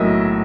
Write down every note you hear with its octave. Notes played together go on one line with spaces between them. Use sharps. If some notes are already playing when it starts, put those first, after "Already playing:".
Already playing: B1 A2 F#3 A#3 D#5 E5